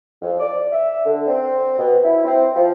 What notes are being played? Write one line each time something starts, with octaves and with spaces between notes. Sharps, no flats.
F2
D5
E5
D3
C4
B2
E4
C4
F3